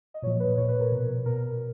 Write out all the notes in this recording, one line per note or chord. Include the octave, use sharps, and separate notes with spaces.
D#5
A#2 F3 C#5
B4
A#2 F3 C#5
B4
A#4
B2
B2 A#4